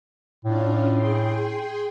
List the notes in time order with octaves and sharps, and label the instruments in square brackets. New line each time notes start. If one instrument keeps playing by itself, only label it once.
[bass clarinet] A2 [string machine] C#4 D4 F4
[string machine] G#4 G5 C6